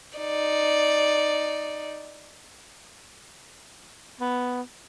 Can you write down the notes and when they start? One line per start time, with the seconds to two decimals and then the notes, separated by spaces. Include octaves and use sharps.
0.18 D#4 D5
4.20 B3